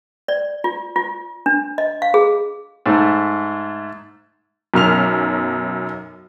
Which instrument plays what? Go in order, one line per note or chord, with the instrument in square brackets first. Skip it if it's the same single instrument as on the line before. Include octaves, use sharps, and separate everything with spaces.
[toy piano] D5
F4
F4
D4
D#5
F5
G#4
[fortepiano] G#2 A3
[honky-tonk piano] B1 F#2 F6 F7